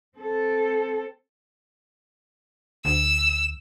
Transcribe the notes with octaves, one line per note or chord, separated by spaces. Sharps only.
C4 A4
D2 E6